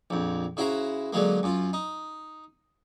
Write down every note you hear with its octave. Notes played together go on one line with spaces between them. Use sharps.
A#1 F2
C#3 E4 F#4 C5 A#5
D3 F#3 G#3 A#3
F#2 F4
D#4